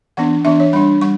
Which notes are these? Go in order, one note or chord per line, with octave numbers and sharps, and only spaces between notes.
E3 B3 D4 F#5
E3 B3 D4 E5
C#5
G3 D4 B5
G3 C#6